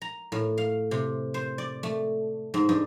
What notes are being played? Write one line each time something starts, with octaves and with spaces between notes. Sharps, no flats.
A#5
A2
F5
C3
C5
D5
A3
G#2
G2